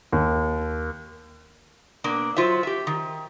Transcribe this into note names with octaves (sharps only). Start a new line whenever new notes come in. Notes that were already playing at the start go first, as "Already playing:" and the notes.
D#2
B2 A#3 D4
F#3 F4 C5 E5
G4 E5
D#3